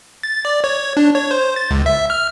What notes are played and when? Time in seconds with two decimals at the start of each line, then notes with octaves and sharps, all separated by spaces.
0.23 A6
0.45 D5
0.64 C#5
0.97 D4
1.15 C#5
1.31 C5
1.56 A6
1.71 C#2
1.86 E5
2.10 F6